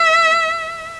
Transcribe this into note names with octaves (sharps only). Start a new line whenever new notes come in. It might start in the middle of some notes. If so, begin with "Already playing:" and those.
Already playing: E5